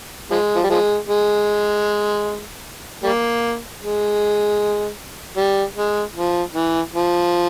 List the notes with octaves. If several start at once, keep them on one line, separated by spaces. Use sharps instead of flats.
F3 G#3
F3
G3
F3 G#3
G#3
G3 A#3
G#3
G3
G#3
F3
E3
F3